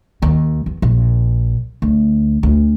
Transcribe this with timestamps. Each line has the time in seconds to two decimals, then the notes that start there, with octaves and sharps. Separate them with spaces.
0.22 D#2
0.66 E2
0.82 A#1
1.82 D2
2.43 D2